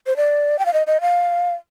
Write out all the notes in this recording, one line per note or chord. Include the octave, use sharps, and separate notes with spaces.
C5
D5
G5
F5
D#5
D#5
F5